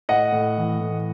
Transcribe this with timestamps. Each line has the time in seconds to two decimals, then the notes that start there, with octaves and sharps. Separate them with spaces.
0.09 A2 D#5 F#5
0.32 A2
0.58 E3
0.81 A2